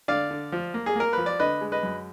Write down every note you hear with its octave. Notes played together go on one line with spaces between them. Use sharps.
D3 D5 F5
D3
F3
A#3
G#4
A#3 A#4
F3 B4
D5
D3 B4 D#5
G#3
B4 D#5
F#2